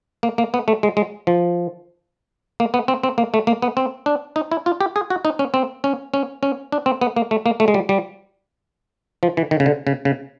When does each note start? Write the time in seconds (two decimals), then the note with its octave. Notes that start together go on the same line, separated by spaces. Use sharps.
0.23 A#3
0.38 A#3
0.54 B3
0.68 A3
0.83 G#3
0.97 G#3
1.27 F3
2.60 A#3
2.74 B3
2.88 C4
3.04 C4
3.18 A#3
3.34 A3
3.47 A#3
3.62 B3
3.77 C4
4.06 D4
4.36 D#4
4.51 E4
4.66 F4
4.81 G4
4.96 G#4
5.10 F#4
5.25 D#4
5.39 C#4
5.54 C4
5.84 C#4
6.14 C#4
6.43 C#4
6.72 D4
6.86 C4
7.01 B3
7.16 A#3
7.31 A3
7.46 A#3
7.60 A3
7.68 G#3
7.74 G3
7.89 G3
9.23 F3
9.37 E3
9.51 D#3
9.60 C#3
9.66 D3
9.87 C#3
10.05 C#3